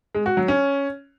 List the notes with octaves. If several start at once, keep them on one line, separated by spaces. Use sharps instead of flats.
G#3
F#4
F#3
C#4